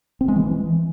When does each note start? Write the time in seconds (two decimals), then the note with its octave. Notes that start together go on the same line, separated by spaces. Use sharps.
0.21 C4
0.28 G#3
0.36 E3